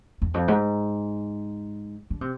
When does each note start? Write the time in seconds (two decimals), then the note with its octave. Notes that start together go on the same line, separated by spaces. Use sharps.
0.22 E2
0.34 F2
0.48 G#2
2.10 D3
2.21 C3